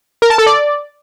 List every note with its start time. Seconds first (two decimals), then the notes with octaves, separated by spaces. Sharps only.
0.22 A#4
0.30 A5
0.38 A4
0.46 D5